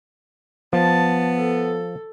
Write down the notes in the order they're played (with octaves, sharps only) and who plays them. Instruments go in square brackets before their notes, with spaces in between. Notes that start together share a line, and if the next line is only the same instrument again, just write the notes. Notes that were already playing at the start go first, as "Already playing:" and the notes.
[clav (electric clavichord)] F3 [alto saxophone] B3 [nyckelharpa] A5
[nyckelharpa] A4